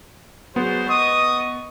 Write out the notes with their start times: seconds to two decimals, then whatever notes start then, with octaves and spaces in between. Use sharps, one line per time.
0.56 F#3 B3 G#4 C5
0.90 D#5 C#6 D#6